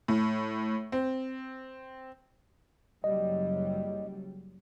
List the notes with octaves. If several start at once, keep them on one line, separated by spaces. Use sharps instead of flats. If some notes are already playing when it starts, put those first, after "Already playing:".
A2
C4
F#1 F#3 G3 D#5